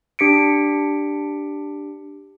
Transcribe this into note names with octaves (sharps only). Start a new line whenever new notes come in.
D4 G4 B6 C#7 D7